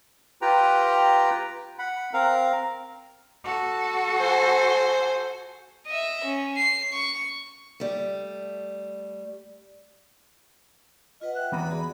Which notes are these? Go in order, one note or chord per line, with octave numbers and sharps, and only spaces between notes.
F4 G4 B4 G5 A#5
F#5 B5
C4 A#4 F5 A#5
F#4 A4
C5 G#5
D#5 E5
C#4
C7
C#6
G3 A3
F4 B4 D#5 F#5
E5 F#5 G5 F#6
E3 B3 A#5 B5
F#4 G#4 D5